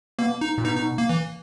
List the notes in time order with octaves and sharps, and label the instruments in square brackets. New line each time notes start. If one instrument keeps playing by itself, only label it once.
[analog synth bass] B2 [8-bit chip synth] A#3
[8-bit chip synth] D#4
[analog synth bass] A#2
[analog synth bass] B2 [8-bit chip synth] D#4
[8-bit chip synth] D#4
A#3
E3